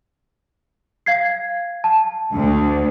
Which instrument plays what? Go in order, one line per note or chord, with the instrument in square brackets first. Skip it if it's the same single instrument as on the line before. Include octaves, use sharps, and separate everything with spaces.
[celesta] F5 G#6 C7
A5
[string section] D2